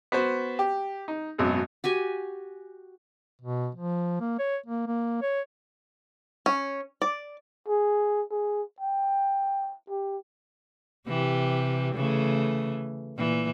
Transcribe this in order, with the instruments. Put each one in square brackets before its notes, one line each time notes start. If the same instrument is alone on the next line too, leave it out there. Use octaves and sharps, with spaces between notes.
[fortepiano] B3 F#4 C5
G4
D#4
G#1 F#2 B2
[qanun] F#4 G4 G#5
[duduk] B2
F3
A#3
C#5
A#3
A#3
C#5
[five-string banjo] C#4
D5
[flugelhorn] G#4
G#4
G5
G4
[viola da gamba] C3 E3 G4
C#3 E3 A3
A#2 E3